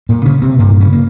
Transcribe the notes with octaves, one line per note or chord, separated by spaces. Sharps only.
A#2 A#3
C#3 C#4
C3 C4
G2 A#2 A#3
C#3 C#4
A#3